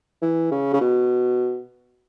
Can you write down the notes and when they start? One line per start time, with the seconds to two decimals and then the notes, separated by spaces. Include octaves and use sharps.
0.22 E3
0.51 C#3
0.73 C#3
0.81 B2